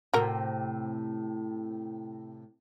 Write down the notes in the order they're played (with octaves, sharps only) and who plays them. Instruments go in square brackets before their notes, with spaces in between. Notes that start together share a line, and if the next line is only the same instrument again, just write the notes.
[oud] A2 C3 [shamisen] F#4 A#4